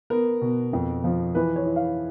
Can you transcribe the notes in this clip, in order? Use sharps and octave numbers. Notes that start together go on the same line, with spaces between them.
B3 A#4
B2
F2
F3
E3 B4
C#5
E4
F5